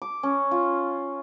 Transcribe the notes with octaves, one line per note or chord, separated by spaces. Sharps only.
D6
C#4
F4